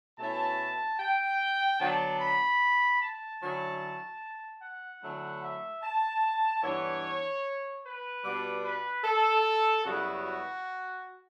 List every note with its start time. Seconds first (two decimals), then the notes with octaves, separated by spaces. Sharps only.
0.18 B2 A3 C#4 E4 A5
0.99 G5
1.80 D3 F#3 B3 D4 A5
2.20 B5
3.01 A5
3.41 D3 F#3 C#4 E4
4.61 F#5
5.02 D3 F#3 A3 C#4 E4
5.42 E5
5.83 A5
6.63 G2 E3 B3 D4 C#5
7.84 B4
8.24 B2 G3 B3 D4
8.63 B4
9.04 A4
9.84 F#2 C#3 G3 B3 E4 F#4
10.24 F#4